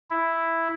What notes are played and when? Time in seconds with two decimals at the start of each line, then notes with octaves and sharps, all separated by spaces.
0.10 E4